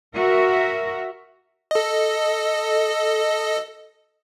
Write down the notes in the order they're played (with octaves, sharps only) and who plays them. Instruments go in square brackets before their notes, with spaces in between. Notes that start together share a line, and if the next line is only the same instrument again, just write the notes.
[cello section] F#4 A#4 E5
[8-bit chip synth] A4 D#5